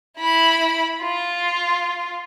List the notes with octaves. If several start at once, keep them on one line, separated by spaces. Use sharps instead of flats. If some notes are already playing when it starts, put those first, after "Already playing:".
E4 B5
F4